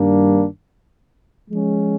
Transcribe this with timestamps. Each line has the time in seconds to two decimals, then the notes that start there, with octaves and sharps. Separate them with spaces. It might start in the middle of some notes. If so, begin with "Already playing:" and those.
Already playing: G2 D#3 G3 A#3 D4
1.50 F3 G#3 C#4